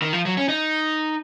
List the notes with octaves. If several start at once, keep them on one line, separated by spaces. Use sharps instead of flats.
D#3
F3
F#3
C#4
D#4